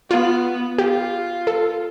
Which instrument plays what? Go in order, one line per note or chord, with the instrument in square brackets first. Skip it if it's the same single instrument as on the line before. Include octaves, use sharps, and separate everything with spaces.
[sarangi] B3 [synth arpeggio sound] F4
[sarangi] F4 [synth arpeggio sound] G4
[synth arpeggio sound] A4